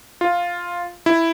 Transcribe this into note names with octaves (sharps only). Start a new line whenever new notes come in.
F4
E4